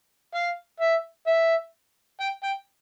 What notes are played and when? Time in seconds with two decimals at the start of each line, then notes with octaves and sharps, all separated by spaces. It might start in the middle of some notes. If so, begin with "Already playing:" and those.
0.34 F5
0.80 E5
1.27 E5
2.20 G5
2.44 G5